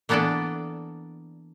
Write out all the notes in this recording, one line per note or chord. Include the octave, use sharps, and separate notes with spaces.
E3 A#3 B3 D4 A4 D5